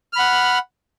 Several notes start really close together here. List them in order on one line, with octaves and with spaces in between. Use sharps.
F6 B5 F#5